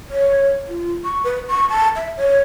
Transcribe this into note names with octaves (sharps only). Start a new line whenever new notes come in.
C#5
F4
C#6
B4
C#6
A5
E5
C#5